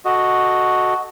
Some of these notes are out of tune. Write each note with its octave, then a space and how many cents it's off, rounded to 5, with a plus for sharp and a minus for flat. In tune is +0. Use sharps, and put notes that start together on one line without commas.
F#4 +0 A4 +0 D#5 +0